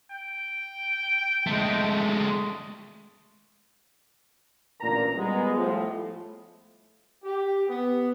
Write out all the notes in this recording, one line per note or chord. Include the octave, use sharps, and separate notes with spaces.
G5
G#3 A3
A1 A#2 D3 A#4 A#5
G3 G#3 B3
A2 F3
G4
B3